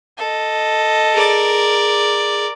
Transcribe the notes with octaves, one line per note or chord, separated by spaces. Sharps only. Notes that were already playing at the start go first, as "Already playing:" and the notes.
A4 D#5
G#4 A#4 D5